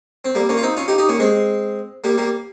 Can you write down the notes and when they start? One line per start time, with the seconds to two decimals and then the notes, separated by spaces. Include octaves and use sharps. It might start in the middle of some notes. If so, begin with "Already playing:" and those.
0.25 C4
0.35 G3 A#3
0.49 A#3 C#4
0.58 F4
0.63 C4 D#4
0.77 C#4 F4
0.88 D#4 G4
0.98 D#4 G4
1.09 A#3 C#4
1.19 G#3 C4
2.04 G3 A#3
2.18 G3 A#3